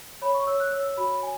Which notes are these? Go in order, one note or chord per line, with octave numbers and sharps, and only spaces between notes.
C#5 B5
C#6
C#5 E6
F#6
C#5 E6
F#4 B5
G#5